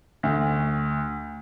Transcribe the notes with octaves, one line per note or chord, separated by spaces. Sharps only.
D2